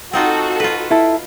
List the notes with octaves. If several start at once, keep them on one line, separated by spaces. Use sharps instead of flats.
C4 D#4 F4 F#4 A4
F4 B4
E4 A4